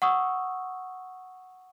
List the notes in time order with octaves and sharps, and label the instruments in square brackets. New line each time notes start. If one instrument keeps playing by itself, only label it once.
[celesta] F#5 C#6 D#6 E6